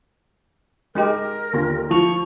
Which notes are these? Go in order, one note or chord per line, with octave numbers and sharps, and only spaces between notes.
G#3 D#4 G4 A#4
D#2 D3 F4
F3 C#6 F7